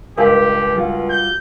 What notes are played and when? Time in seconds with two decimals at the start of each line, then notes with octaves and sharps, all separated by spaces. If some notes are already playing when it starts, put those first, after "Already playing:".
0.18 C#2 G2 G4 A#4 F5 B6
0.76 G3 F4 F#4
1.10 G6